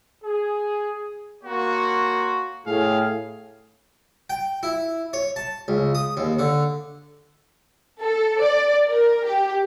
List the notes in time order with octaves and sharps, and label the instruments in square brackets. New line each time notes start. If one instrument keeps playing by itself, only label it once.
[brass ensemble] G#4
[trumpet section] A#3 C#5 C6 [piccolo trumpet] F#4
[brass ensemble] A2 [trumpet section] G#4 [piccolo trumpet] F5
[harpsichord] G5
E4
C#5
A5
C#2
D#6
D#2
D3
[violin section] A4
D5
A#4
G4